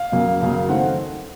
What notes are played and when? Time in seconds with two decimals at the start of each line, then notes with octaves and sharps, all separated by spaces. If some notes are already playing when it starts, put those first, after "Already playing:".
Already playing: F5
0.12 F#2 C#3 F#3 A#3
0.40 F#2 C#3 F#3 A#3
0.69 D#3 F#3 A3 C4 F#5